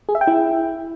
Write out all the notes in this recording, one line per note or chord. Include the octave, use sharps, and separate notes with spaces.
G#4
E5
G5
E4